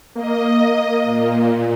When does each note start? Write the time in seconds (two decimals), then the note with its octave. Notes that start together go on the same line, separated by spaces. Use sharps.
0.15 A#3 D#5
1.04 A#2